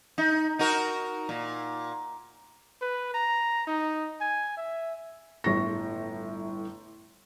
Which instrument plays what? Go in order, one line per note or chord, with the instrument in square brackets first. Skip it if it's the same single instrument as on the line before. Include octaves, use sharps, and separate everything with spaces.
[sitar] D#4
D#4 F#4 A#4
A#2
[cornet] B4
A#5
D#4
G#5
E5
[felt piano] G1 A2 C#6 A#6